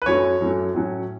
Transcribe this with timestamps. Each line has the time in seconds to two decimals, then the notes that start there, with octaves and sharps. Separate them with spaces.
0.02 B4
0.06 F#2 F#3 A3 C#4 C#5
0.41 F#2 F#3 A3 C#4
0.74 A2 F#3 C#4